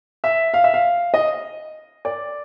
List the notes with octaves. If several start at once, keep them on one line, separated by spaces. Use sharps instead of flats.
E5
F5
E5
F5
D#5
D5